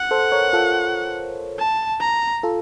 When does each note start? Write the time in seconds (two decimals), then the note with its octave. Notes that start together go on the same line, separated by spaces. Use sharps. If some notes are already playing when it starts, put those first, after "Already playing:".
Already playing: F#5
0.11 A4 C5
0.32 A#4 C#5
0.53 F4 A4
1.59 A5
2.01 A#5
2.43 F4 A4